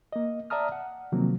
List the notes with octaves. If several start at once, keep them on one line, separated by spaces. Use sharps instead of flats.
A#3 D#5
D5 E5 A5 A#5 D#6 F6
F#5
C3 D#3 F3 F#3 A#3 C4